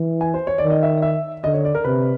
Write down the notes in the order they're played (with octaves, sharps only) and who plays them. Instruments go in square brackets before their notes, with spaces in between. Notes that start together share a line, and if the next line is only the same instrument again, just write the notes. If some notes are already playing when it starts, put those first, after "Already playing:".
Already playing: [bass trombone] E3
[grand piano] G#5
C5
C#5
[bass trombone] D#3 [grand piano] D5
[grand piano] D#5
E5
E5
[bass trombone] D3 [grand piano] D#5
[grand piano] C#5
D5
A#4
[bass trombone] C3 [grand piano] B4